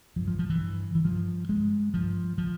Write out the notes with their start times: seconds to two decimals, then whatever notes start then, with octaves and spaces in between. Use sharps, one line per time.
0.16 G2 F3
0.28 F3
0.39 F3
0.50 E3
0.61 G2
0.95 E3
1.05 G2 F3
1.49 G2 G#3
1.94 G2 F3
2.38 F3